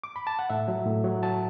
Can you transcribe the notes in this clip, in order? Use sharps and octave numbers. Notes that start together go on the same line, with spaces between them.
D6
B5
A5
F#5
A2 E5
F#3
A2
F#3
F#3 A5